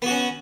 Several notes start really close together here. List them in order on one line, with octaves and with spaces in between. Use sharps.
B3 F#4 C#4